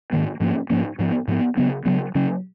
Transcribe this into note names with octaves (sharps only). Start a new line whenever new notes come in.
G#2 D#3 A#3
G#2 F3 A#3 C#4
G#2 F3 A#3 C#4
G#2 F3 B3
G#2 F3 B3
C#3 F#3 B3
C#3 F#3 B3
C#3 F#3 C#4